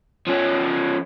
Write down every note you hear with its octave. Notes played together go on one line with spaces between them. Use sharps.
F3 C#4